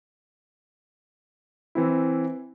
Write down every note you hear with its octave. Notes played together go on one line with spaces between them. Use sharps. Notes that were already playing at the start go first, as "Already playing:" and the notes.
E3 C4 E4